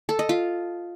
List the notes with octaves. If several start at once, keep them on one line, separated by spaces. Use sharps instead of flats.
A4
D#5
F4